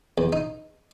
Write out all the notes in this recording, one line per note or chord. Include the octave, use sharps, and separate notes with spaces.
E2
D#4